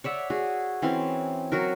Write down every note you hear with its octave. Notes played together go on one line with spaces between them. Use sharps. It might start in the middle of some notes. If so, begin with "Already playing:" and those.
C#5 D5 E5 F#5
F#4 G#4
E3 C4 C#4 C6
F#3 F#4 A#4